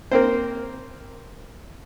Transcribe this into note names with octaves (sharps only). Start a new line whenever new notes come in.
A#3 C4 C5